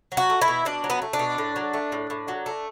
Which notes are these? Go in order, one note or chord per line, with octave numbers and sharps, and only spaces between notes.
F#3
F#4
A3
E4
B2
B2 D4
F#3
B3
A3
D4
B2
A2
F#3
A3
A2
A2
F#3
A3